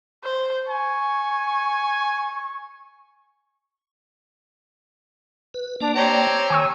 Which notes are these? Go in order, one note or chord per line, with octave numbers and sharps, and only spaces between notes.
C5
G#5 C#6
B4
A#3 D4 D5
C4 G4 C#5 A#5
D#3 G#5 C#6 E6